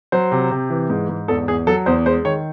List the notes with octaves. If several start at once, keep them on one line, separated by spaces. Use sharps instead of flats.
F#3 C5
C3
C3
E3
G#2
G#2
E2 A4
E2 G#4
F#3 A4
E2 C5
G#3 C5
D#3 C#5